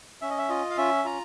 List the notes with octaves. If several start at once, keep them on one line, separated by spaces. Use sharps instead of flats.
C#4 E5
D#5
E5
F4 D#5
F5
C#4 E5
F4 A#5